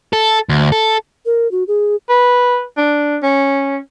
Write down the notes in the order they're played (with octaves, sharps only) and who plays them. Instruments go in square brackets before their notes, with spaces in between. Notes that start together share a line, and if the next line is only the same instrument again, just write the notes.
[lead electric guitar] A4
D2
A4
[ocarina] A#4
F#4
G#4
[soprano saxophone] B4
D4
C#4